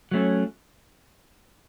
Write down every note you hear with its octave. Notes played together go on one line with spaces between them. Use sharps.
F#3 A3 C#4